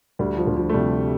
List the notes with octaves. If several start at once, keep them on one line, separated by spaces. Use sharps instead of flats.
D2 G3
F3
D2
F3
A3
C3 G3